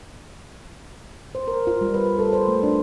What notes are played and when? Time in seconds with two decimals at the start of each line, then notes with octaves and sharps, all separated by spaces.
1.35 C5
1.48 A#4
1.67 F4
1.81 G3
1.94 B4
2.19 A4
2.33 C5
2.48 A3
2.63 D4